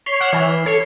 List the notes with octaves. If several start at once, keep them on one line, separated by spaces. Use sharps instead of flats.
C#5 B6 C7 G7
F#5 D6 F6 F#7
E3 G#6 F#7
D6 F6
A4 C#5